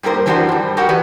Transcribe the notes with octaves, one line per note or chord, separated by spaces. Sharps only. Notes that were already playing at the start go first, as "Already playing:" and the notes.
G2 G3 A#3 A#4 C5
E3 G3 D4 D#4 F#4 C5
G2 G3
F#4 G4 A#4 F#5
E3 B4 D5